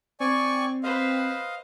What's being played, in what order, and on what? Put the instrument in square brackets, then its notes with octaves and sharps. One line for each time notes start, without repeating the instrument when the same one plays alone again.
[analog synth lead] C4 [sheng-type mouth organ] D5 G#5 C#6
[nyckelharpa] B4 C5 [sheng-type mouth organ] D#5 F5